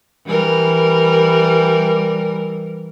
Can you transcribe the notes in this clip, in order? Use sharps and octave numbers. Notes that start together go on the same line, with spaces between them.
E3 G3 A#4